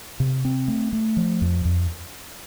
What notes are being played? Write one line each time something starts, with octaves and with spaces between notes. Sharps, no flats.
C3
C4
A3
A3
F3
F2
F2